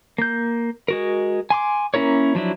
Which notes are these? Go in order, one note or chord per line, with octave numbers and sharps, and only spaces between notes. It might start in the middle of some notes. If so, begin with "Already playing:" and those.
A#3 G6
G#3 F#4 A#4
G#5 C6 D6
A#3 C#4 E4 A#4 C#5
F3 F#3 D4 E4